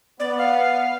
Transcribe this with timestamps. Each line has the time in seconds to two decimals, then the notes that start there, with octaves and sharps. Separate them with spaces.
0.20 B3 D5
0.38 F5